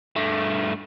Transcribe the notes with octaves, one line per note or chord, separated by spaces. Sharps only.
G2 A3